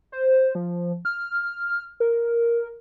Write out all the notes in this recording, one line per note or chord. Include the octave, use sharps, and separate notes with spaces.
C5
F3
F6
A#4